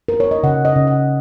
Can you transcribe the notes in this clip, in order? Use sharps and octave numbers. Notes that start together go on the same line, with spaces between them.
A#4
C#5
D#5
C#3 F#5
D#5
C#3
F#5